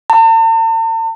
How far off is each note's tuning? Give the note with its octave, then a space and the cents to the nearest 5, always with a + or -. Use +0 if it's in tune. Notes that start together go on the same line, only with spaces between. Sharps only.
A5 +45